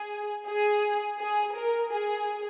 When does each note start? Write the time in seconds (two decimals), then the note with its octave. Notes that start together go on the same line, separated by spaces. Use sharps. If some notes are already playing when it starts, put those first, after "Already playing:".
Already playing: G#4
0.47 G#4
1.20 G#4
1.55 A#4
1.92 G#4